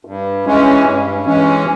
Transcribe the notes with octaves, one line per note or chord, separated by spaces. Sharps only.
G2
E3 G#3 C#4
G2
E3 G#3 C#4